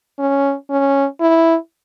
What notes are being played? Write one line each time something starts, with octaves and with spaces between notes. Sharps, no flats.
C#4
C#4
E4